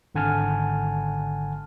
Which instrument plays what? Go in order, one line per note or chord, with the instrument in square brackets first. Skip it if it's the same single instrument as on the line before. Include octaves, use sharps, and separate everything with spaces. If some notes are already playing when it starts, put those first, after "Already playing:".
[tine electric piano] G#1 D3 F#5 G#5 A5 F6